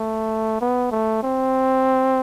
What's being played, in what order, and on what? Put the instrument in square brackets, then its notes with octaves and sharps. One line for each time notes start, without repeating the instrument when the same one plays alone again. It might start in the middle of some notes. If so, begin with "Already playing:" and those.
Already playing: [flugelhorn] A3
B3
A3
C4